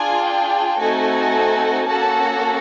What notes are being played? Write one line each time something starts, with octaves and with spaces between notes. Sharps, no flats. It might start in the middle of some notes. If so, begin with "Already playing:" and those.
Already playing: D4 F4 G#4 G#5
G5
A3 C4 D#4 F#4 A4 G#5
A#3 C#4 F#4 A4 A5